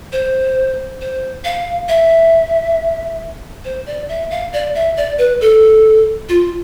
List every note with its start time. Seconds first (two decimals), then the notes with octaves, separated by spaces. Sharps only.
0.13 C5
1.01 C5
1.45 F5
1.89 E5
3.65 C5
3.86 D5
4.09 E5
4.31 F5
4.53 D5
4.75 E5
4.97 D5
5.18 B4
5.41 A4
6.29 F4